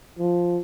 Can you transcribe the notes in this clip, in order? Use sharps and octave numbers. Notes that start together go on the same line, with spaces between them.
F3